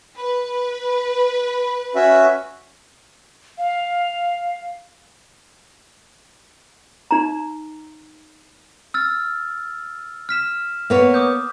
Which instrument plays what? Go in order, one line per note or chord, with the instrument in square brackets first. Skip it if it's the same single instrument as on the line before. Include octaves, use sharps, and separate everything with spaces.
[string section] B4
[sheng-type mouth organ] C#4 F#4 E5
[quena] F5
[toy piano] D#4 A#5
[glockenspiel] E6 F6 A6
F6 B6 E7
[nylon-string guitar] A#3 B3 C#5
[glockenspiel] D6 D#6 G6